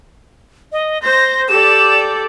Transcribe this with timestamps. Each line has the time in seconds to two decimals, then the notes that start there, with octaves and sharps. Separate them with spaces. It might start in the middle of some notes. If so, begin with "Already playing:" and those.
0.72 D#5
1.02 C5 A#6
1.48 G4 A4 D5 E7